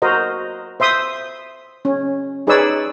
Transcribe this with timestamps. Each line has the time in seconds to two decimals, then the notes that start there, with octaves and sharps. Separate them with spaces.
0.02 F#4 A#4 C5 D#5
0.80 C5 E5 C6 D#6
1.85 C#4
2.47 D#4 G#4 B4 C#5 D5 E6